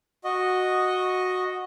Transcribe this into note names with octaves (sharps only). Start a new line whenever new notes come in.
F#4 D#5